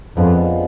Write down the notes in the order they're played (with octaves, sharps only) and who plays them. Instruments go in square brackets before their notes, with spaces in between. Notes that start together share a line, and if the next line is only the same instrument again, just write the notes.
[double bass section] F2 [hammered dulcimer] D3 F3 G#3 B3